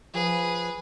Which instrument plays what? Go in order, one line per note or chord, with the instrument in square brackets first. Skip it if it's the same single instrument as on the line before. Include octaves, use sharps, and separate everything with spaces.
[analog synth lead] F3 [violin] G#4 B4